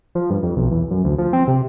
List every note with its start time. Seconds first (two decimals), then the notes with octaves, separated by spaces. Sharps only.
0.15 F3
0.30 G2
0.43 F2
0.57 B1
0.71 E2
0.91 F#2
1.04 D2
1.18 F3
1.33 C4
1.48 C3